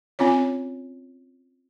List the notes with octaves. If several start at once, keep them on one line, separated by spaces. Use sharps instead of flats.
C4 C#4 F4 C#5